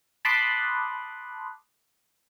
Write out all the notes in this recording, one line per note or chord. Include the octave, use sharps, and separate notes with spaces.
A5 B5 C6 D6 D#6 F#6